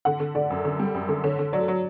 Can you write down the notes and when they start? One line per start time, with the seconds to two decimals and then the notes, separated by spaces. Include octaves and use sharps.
0.05 D3 F#5
0.20 D3
0.35 D3 D5
0.50 F#2
0.65 D3
0.80 G3
0.94 F#2
1.09 D3
1.24 D3 C#5
1.39 D3
1.53 F#3 D5
1.68 F#3